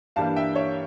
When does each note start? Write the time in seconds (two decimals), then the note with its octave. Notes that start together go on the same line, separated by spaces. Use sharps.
0.16 G2 E3 G3 A#3 D4 F5 A5
0.36 E5 G5
0.56 C#5 E5